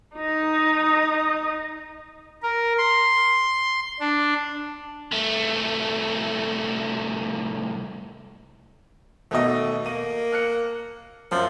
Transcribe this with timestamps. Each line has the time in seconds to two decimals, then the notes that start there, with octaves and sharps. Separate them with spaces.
0.16 D#4 D#5
2.42 A#4
2.78 C6
4.00 D4
5.12 C2 A3
9.31 D#2 B2 A3 D#5
9.86 A#3 D#7
10.32 F6 F#6 C#7
11.32 F#2 F3